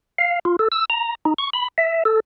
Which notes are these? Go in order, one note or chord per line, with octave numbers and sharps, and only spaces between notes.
F5
F4
A4
E6
A#5
D#4
C#6
B5
E5
A4